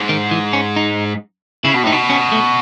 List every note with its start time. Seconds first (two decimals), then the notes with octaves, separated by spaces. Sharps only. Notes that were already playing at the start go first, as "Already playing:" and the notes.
Already playing: G#2
0.09 D#3
0.31 E3
0.53 C#4
0.76 D#4
1.64 C#3 E4
1.74 B2
1.83 A2 D#4
1.92 B2
2.10 C#4
2.32 A3